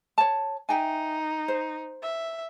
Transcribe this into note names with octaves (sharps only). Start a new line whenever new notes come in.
C#5 A5
D#4 E5 G5 G#5
C5
E5